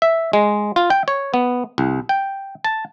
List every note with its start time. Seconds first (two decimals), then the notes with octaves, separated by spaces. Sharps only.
0.02 E5
0.33 G#3
0.76 F4
0.90 G5
1.08 C#5
1.34 B3
1.78 C2
2.09 G5
2.64 A5